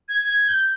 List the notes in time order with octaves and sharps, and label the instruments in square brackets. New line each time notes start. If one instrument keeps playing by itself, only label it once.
[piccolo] G#6
G#6
G6